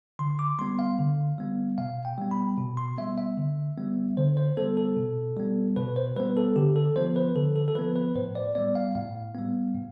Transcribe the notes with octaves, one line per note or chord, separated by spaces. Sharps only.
D3 C6
D6
G3 B3 C6
F5
D3
G3 B3
B2 F5
G5
G3 B3
B5
B2
C6
G3 B3 E5
E5
D3
G3 B3
D3 C5
C5
G3 B3 A4
A4
B2
G3 B3
B2 B4
C5
G3 B3 B4
A4
D3 G4
A4
F3 B3 C5
B4
D3 A4
A4
A4
F3 B3 B4
B4
A2 C5
D5
G3 B3 D5
F5
A2 F5
G3 B3
A2